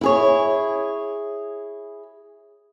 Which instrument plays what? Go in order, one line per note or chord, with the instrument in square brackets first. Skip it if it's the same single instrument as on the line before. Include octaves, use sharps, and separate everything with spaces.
[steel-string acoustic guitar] E4 G#4 C#5